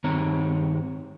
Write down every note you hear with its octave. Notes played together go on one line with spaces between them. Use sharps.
G2 D#3 C4 C#5 A#5